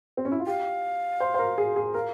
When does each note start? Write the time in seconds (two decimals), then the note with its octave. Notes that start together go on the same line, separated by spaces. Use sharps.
0.17 C4
0.25 C#4
0.32 E4
0.40 F4
0.47 G4 F5
1.20 C5
1.34 C5
1.39 A#4
1.58 G#4
1.76 G#4
1.94 A#4 F5